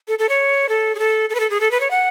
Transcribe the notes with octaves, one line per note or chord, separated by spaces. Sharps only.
A4
A4
C#5
A4
G#4
A4
A4
B4
A4
G#4
A4
B4
C#5
F#5